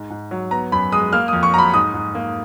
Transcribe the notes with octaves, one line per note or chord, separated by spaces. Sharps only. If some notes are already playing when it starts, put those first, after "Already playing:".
Already playing: G#2
G#2
F#3
B3 A#5
F#2 B5
G#3 D#6
A#3 F6
D#6
F2
C#6
F#3 A#5 B5
G#2 D#6
G#2
A#3